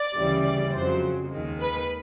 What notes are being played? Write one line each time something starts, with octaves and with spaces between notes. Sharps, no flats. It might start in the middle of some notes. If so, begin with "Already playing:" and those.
Already playing: D5
D2 C#3 E3 G3
D5
F2 C#3 F#3 C5
D#2 D#3 G#3
B4